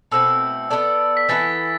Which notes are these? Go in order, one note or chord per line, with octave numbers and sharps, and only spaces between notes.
B2 A3 C4 E4 E6
B3 D4 A4 D5
B6
E3 B3 E4 A4 A6